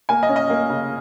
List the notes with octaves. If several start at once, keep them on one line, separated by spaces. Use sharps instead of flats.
A#3 G#5
D#5
C#4
D#5
A#3
C#3